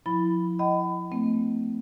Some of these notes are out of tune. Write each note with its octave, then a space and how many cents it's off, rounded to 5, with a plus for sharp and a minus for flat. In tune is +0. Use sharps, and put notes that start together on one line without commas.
F3 +25 E4 +0 B5 +0
D#5 +0 F#5 +45 B5 +25
A3 +20 C4 -25